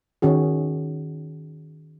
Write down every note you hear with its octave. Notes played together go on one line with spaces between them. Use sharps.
D#3 C#4 F#4 G#4